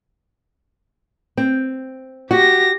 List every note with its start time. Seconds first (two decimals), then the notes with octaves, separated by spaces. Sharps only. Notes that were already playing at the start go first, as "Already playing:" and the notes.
1.37 C4
2.31 F#4 G4 A#6